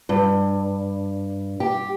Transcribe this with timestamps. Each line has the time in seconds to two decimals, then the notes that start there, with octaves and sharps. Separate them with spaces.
0.09 G2
1.60 G4